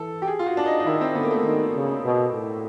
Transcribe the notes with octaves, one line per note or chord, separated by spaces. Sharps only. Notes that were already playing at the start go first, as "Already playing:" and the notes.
Already playing: E3 A4
G4
G#4
F4
F#4
D4
D#4
D#4
D#3 E4
C4
D3 B3
A#3
A3
D#3
C#3
B2
A2